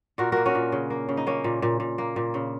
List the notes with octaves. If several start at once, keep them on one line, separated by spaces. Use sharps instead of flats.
A#2 F#4 A#4
A#3 F#4 A#4
C#4 F#4
A#2
C#3
A#3
C#3
D#4
A#3 C#4
A#2
A#2
A#2
A#3
A#2
C#3